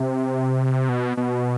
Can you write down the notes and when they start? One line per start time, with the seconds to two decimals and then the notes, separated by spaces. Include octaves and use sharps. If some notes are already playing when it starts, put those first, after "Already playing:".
Already playing: C3
0.89 B2
1.17 B2